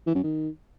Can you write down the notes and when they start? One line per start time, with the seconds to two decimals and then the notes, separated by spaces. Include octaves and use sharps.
0.07 E3
0.15 F#2
0.23 D#3